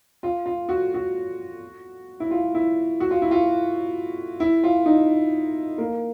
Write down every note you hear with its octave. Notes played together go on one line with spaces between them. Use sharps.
F4
F4
F#4
F#4
E4
F4
E4
F#4
F4
E4
F4
E4
F4
D#4
A#3